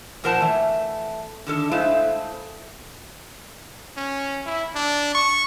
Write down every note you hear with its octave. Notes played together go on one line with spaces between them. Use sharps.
A#2 F3 A#4 C5 F#5 A5
E3 A3
D3 D#3 A4
G#3 A3 E4 A4 C5 F5
C#4
E4
D4
C#6